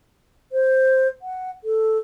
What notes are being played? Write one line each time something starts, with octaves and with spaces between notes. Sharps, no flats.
C5
F#5
A4